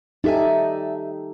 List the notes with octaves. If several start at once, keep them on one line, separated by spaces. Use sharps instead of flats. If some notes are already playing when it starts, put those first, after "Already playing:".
D#4 G4 A4 D5 E5 G#5